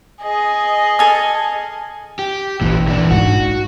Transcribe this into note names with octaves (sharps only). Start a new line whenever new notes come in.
G#4 D#5
A4 G#5 F6
G4
A1 A#2 E3
E3 D4
G#2 G#3 F#4